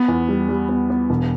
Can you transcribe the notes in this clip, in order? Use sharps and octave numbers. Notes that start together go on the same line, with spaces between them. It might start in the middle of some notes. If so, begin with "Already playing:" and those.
Already playing: B3
E2
G3
G3
B3
B3
E1